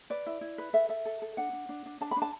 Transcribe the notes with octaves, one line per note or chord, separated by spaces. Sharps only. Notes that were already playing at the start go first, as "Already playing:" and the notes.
B4 D5
E4
E4
B4
A4 E5
A4 E5
A4
A4
D4 F#5
D4
D4
D4
D4 A5
B5
D4
A5